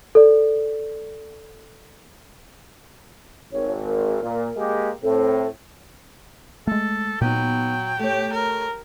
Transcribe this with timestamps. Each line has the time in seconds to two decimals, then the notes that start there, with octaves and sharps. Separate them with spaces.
0.15 A4 D5
3.52 G#1 C#5
3.84 A#4
4.23 A#2
4.57 G#3 A#3 G4
5.04 A2 C4 A4
6.67 G#3 A3 A4
7.21 A#2 F#3 B3 D#4 G5
7.99 A3 G4 C#5
8.33 A#4